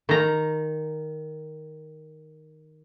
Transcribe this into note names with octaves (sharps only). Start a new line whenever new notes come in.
D#3 A#5